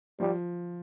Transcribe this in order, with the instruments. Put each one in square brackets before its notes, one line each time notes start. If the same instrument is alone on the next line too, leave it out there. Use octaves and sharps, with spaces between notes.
[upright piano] F3 [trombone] G3